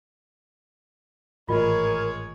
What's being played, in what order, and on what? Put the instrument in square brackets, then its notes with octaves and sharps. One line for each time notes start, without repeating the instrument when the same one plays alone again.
[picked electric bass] G#1 A2 E3 [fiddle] G#3 C#5 [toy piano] F4 D#5 [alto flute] A#4